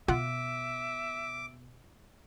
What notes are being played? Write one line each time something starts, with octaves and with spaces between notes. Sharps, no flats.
B2 F4 E5 F#5 D6